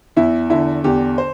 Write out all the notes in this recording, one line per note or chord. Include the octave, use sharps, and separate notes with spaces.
E2 E4
D3 E4
E2 G4
C5